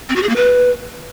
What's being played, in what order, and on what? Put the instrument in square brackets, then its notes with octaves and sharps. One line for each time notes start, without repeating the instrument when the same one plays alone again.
[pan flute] C4
F#4
G#4
A#3
B4